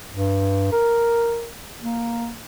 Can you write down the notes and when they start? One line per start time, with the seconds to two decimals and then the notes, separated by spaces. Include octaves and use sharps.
0.11 G2
0.72 A#4
1.79 A#3